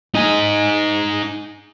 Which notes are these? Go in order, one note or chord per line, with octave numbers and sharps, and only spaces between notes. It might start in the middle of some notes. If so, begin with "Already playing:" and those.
D#4 G#5